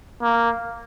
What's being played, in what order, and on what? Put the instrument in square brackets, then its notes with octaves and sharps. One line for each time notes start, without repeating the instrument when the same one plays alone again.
[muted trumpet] A#3